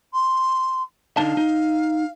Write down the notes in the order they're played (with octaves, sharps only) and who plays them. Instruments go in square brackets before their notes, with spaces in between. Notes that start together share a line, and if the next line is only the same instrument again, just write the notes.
[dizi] C6
[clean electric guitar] D3 D#4 A5 [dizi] F5
[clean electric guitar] D#4